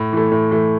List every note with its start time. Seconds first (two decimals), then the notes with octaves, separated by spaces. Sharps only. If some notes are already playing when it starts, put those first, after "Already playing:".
Already playing: A2
0.13 E3 A3
0.32 A2
0.51 E3 A3